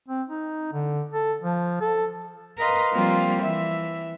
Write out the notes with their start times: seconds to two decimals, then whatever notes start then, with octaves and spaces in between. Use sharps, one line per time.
0.08 C4
0.28 D#4
0.73 D3
1.13 A4
1.42 F3
1.81 A4
2.58 A#4 B4 D#5 F5 A#5 C6
2.93 F3 G3 A#3 C4 F4
3.40 E3 E5